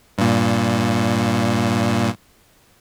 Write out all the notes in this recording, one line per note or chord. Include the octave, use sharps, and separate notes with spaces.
G2 A#2